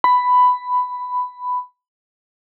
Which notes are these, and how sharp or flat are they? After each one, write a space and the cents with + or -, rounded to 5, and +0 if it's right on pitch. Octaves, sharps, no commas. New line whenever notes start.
B5 +10